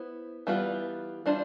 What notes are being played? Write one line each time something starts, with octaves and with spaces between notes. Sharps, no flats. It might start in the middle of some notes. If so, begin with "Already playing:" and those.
Already playing: B3 E4 C5
E3 G3 B3 F4 B4
E3 G3 D4 F4 C5